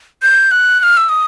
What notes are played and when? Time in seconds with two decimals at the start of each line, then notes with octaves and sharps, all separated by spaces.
0.22 G6
0.51 F#6
0.80 F#6
0.83 F6
0.97 E6
1.09 D#6